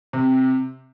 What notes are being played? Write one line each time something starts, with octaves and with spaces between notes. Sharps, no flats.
C3